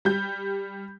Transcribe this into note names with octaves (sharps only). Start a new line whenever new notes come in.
G3 G6